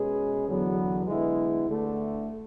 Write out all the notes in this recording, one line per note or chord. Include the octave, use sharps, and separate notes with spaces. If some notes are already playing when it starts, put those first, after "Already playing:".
Already playing: B2 G#3 C#4 G#4 B4
E2 D3 F#3 B3
D3 G#3 B3 E4
D2 D3 A3